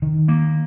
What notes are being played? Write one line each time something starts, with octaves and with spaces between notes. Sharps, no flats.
D#3
A#3